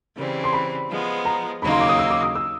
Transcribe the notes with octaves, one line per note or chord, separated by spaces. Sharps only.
C#3 E3 G3 C4
C6
B5
F3 G#3 B3
A#5
D#2 C#3 F#3 A#3 D#4 B5
C6
D6
D#6
E6
D6
D#6
E6